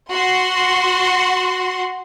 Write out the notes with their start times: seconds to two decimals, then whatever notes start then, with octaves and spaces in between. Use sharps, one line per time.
0.11 F#4 C6